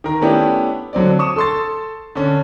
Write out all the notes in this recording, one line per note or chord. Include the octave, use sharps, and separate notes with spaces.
D#3 A#4
A3 B3 C#4 D4 E4 G4
D3 F#3 C4 D5
C#6 D#6 E7
A4 C6 A6
D3 C#4